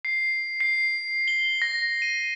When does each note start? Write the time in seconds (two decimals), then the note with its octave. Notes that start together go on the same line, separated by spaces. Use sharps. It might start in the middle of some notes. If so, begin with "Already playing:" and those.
0.05 C7
0.60 C7
1.28 G7
1.62 A#6
2.02 D#7